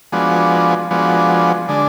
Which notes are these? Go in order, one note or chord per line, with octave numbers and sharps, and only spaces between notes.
F3 G#3 B3 D4 F#4
F3 G#3 B3 D4 F#4
D3 G#3 D4